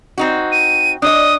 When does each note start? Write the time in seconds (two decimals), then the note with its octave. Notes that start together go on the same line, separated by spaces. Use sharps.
0.18 C4 D#4 F#4
0.52 D#7
1.02 D4 C#5 D#5 D#6